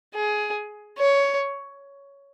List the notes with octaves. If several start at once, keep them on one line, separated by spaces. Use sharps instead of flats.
G#4
C#5